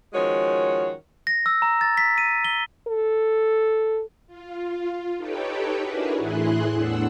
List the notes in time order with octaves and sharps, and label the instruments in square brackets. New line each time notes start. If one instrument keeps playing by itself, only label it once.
[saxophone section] D#3 F3 G#3 C#4 F#4 C#5
[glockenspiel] A#6
E6
A#5
A6
B6
D#7
G7
[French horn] A4
[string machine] F4
D#4 G4 A4 B4 C#5 G5
D4 E4 F#4 G#4 A#4 B4
A2 E3 E4 G#4 C6 F#6
E2 A2 D4 F#5 E6